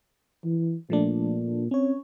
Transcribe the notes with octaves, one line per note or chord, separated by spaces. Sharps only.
E3
A#2 F3 A3 D4
C4 C#4 C#5